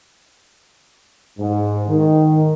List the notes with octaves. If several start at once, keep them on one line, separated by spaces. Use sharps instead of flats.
G#2
D#3